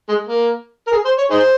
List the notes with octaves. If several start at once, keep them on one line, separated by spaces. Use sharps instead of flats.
G#3
A#3
A#4
G#4
C5
C#5
D#4 G#4 C5